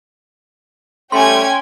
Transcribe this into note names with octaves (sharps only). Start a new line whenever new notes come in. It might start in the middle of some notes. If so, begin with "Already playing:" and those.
G3 A3 C#4 G5 G#5 C6 G#6